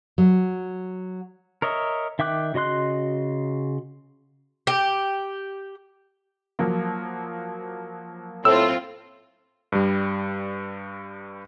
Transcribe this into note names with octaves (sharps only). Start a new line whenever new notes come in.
F#3
A#4 C#5 D#5 E5
D#3 E5 G5 D6 F#6
C#3 F#4 D#5 C6 F#6
G4
F3 F#3 A#3
A2 C4 F4 E6
G2 G3